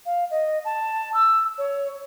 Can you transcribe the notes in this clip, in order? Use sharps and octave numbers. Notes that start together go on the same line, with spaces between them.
F5
D#5
A5
E6
C#5